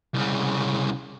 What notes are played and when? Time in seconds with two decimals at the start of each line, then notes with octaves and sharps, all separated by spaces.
0.14 C2 C#3